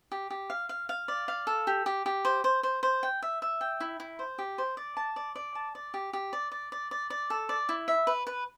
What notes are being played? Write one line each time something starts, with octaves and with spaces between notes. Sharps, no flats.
G4
G4
F5
F5
F5
D5
F5
A4
G4
G4
G4
C5
C5
C5
C5
G5
E5
E5
G5
E4
E4
C5
G4
C5
D5
A5
D5
D5
A5
D5
G4
G4
D5
D5
D5
D5
D5
A4
D5
E4
E5
B4
B4